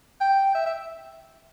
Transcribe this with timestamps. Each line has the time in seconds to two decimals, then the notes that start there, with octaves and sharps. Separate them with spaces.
0.21 G5
0.55 E5
0.66 E5